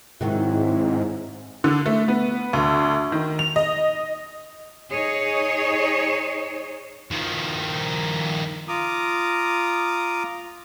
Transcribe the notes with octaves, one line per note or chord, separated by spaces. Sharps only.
G#2 C3 D#3 F#3 E4
D3
A3
B3
D2
D#3
F7
D#5
D#4 G#4 C#5 D#5
D#3 F3
F4 A#5 D6 D#6